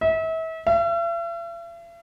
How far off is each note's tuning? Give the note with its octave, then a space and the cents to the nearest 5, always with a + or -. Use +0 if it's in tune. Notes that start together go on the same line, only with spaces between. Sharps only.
E5 -35
E5 +45